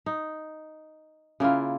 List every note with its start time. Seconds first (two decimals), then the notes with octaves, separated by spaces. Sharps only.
0.06 D#4
1.40 C#3 A#3 E4 F4